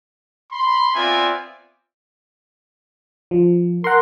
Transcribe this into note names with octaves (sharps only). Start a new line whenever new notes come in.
B5 C6
B3 C4 F4 D5 E5 G#5
F3
A#4 F#5 C6